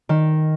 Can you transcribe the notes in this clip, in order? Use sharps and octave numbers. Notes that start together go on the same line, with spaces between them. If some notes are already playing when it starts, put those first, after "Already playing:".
D#3